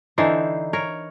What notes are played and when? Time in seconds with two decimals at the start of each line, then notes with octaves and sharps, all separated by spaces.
0.18 D3 E3 D#4 C5
0.73 A#4 C#5